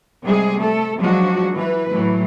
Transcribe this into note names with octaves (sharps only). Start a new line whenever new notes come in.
C3 G3 G#3 G#4
A3 A4
F3 F#3 G#3 D4 F#4
E3 B4
A2 E3 F#3 A3